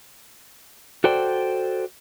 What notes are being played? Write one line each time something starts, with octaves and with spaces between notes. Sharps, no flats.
F#4 A4 C5 D5 G5